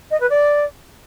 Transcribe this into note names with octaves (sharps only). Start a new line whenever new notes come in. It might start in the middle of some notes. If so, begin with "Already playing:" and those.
D#5
B4
D5